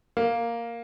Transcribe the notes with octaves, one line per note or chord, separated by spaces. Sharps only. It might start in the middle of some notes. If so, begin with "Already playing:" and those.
A#3